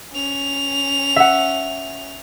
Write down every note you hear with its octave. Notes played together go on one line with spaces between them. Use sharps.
C#4 F7
E5 F#5